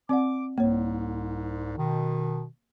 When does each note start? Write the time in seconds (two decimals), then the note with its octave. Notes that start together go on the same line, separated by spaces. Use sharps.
0.09 C4 D5 F#5 D6
0.58 C2 G#2 A#3 C#5
1.78 B2 D#3